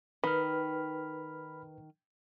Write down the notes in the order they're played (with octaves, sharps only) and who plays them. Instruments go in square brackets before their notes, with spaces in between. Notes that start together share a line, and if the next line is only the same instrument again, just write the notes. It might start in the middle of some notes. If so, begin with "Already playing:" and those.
[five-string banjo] D#3 [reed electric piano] B4 [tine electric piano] B5 F6